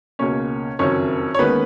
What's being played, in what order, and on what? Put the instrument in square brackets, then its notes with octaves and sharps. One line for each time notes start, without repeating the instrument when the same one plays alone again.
[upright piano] C#2 B2 A#3 C#4 C#5
F#1 F2 D#3 F#3 C#4 C#5
C#5
D#2 D#3 G#3 B3 C#4 B4